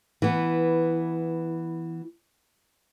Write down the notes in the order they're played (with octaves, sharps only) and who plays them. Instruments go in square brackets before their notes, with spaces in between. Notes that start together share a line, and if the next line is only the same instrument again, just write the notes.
[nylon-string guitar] E3 B3